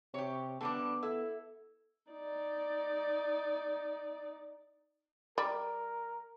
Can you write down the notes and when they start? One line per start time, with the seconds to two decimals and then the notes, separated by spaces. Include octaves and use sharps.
0.14 C3 G4 C#5
0.61 D3 G3 B3 D4 A4 D6
1.03 E4 A4 E5
2.11 D#4 D5
5.38 G3 A#4